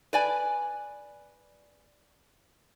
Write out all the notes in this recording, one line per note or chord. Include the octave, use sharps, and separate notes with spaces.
B4 D5 G#5